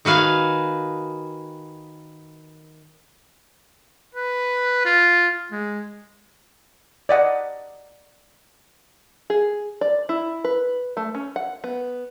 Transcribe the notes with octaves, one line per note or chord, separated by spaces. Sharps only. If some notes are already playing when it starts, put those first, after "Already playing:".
D#3 F#4 B4 F5 G#5
B4
F4
G#3
D5 D#5 F#5
G#4
D5
E4
B4
A3
C#4
F#5
B3